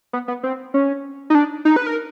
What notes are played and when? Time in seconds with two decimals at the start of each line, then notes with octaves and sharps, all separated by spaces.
0.13 B3
0.28 B3
0.43 C4
0.74 C#4
1.30 D#4
1.35 D4
1.65 D#4
1.76 B4
1.86 A#4